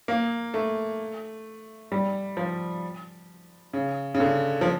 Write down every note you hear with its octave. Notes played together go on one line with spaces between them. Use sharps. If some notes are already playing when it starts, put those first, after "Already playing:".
A#3
A3
G3
F3
C#3
C#3
D3
F3